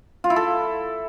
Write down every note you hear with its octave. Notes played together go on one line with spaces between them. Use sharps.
F4
E4
A4